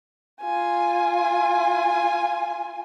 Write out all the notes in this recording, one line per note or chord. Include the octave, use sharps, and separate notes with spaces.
F4 G#5